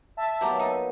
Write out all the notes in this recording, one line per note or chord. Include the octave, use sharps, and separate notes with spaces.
E5 A5
B2 F#3 A#3 E4 G4 A#5
D#4 E4 D#6